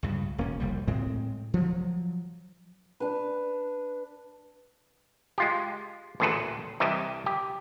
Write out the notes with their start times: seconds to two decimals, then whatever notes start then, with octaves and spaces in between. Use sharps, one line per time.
0.03 C#2 G2 C#3
0.38 E1 A#3 C#4
0.60 F1 C2 G3
0.88 A2 G#3 C4
1.54 F3 F#3
3.00 D4 B4
5.38 G#3 F4 G4
6.20 A1 D2 A#2 G#4 A4 B4
6.80 C2 E3 G4 D#5 A5
7.26 G4